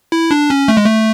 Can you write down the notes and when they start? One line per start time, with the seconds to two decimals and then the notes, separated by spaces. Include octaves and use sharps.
0.12 E4
0.31 D4
0.50 C#4
0.68 A3
0.77 G#3
0.85 A3